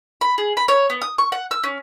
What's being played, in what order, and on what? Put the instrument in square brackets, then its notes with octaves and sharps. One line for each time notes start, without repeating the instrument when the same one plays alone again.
[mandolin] B5
G#4
B5
C#5
B3
D#6
C#6
F#5
E6
C#4